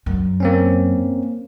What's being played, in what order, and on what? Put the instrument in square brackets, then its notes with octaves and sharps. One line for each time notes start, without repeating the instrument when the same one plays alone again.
[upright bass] F#2
[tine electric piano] A#3 C4 C#4